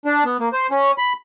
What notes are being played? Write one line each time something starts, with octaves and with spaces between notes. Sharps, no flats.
D4
B3
A#3
C5
C#4
B5